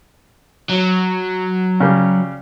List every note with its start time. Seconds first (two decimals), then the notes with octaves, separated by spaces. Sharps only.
0.69 F#3
1.80 C#3 G3